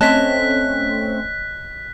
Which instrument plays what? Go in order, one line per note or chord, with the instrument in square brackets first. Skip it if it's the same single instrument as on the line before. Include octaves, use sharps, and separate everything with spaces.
[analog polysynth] A3 C4 C#4 [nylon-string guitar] C#5 D#5 A5 [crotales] F#6 B6